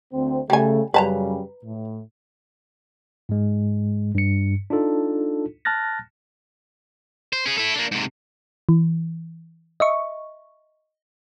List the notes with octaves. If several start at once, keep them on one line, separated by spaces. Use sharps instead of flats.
D2 C4
C#3 G3 A3 G#5
F#2 C#3 G3 B4 A5 A#5
A2
G#2 G#3
G2 C#7
D4 D#4 F4 A4
A5 F6 F#6 A6 A#6
C5
C#4 G#4
E4 A4
A#3 D4
G#2 C3
E3
D#5 E5 C#6